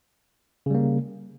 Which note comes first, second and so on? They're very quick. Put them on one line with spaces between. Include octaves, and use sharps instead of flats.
C#3 G3 A#3